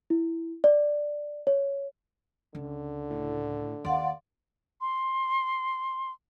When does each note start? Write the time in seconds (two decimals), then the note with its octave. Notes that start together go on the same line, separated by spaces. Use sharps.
0.10 E4
0.64 D5
1.47 C#5
2.55 C#2 D3
3.10 A2
3.85 D#2 D5 F5 F#5 C6
4.81 C6